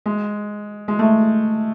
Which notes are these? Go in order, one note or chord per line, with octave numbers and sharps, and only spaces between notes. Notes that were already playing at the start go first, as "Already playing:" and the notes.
G#3
G#3
A3